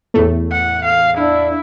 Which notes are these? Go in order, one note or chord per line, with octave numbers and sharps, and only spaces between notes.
E2 A2 A3
F#5
F5
D4 E4